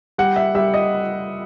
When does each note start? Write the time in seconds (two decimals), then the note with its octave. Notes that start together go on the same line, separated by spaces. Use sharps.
0.18 G3 F#5
0.36 E5
0.55 G3 E5
0.74 D#5